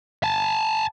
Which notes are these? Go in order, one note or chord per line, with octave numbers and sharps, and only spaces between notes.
G#5 A5